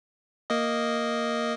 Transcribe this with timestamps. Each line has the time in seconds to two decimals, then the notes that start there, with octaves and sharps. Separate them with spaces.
0.50 A#3 D#5